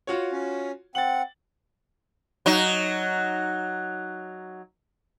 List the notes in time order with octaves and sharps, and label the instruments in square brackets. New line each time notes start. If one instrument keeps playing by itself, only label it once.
[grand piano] F4 F#4 C#5
[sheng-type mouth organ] C#4
[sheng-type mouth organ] C4 F#5 [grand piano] A6 F#7
[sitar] F#3 D#4